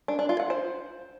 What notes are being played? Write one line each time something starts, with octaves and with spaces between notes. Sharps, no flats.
D4
D4
F4
F#5
C5